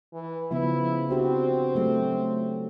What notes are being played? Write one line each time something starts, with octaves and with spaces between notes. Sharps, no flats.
E3
C#3 F3 B3 E4
C4 D4 F#4 G4
F#3 A3 A#3